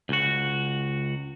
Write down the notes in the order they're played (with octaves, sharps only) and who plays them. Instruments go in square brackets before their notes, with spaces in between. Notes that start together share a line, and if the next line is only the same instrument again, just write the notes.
[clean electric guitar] C#2 F#4